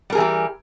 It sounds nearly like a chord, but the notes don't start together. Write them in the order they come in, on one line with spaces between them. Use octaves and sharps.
G3 A#4 G#4 E3 G4